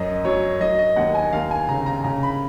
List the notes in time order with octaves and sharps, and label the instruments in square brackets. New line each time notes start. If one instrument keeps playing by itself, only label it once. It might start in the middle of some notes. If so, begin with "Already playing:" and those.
Already playing: [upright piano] F#2 F#3 D#5
F#3 C#5
F#3 D#5
D#5
D#2 F#5
G#5
D#2 F5
G#5
C#3 A#5
A#5
C#3 A#5
B5